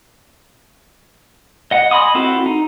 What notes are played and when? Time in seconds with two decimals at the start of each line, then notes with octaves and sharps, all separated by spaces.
1.71 D#5 F#5
1.91 D#5 G#5 B5 C6 D#6
2.15 C4 E4 F#4 A4
2.46 D#4